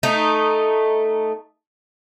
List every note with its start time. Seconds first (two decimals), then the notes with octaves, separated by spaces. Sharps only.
0.03 A3 D#4